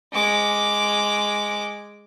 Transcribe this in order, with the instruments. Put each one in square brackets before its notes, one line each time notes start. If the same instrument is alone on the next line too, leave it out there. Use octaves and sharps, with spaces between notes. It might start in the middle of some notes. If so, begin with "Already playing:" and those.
[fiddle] G#3 D6